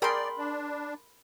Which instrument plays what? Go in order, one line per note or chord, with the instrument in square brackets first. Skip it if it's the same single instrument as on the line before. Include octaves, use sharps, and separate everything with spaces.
[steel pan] G#4 A#4 G5 [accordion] D5 [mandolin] B5 C6
[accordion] D4